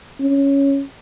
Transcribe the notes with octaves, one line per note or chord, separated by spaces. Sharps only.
C#4